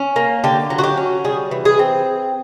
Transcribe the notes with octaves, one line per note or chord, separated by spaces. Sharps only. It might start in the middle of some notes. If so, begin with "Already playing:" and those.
Already playing: C#4
A#3
D3 G4
F#3
F#4
G4
C#4
G3 G#4
E3
G#4
C4